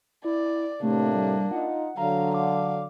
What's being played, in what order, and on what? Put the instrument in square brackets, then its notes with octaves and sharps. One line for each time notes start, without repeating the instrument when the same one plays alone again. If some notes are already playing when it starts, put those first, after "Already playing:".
[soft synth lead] E4 [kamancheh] D5
[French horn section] A2 C3 [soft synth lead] A3 [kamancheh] A#3 D4
[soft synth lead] G3
[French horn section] D#4 F4 [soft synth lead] F#5
[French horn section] D3 F#3 [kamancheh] F5 [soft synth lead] A#5
[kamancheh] F5 [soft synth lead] D6